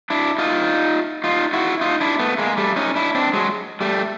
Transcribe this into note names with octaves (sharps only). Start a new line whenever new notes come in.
D4 E4
D#4 F4
D#4 F4
E4 F#4
D#4 F4
D4 E4
A3 B3
G#3 A#3
G3 A3
C#4 D#4
D4 E4
C4 D4
F#3 G#3
G3 A3